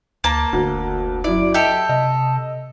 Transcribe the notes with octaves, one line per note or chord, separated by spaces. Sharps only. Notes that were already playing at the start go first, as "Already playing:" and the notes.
D2 A#3 A5
F1 D2
F#2 E4 D5
G4 A4 D#5 E5
C3 D#5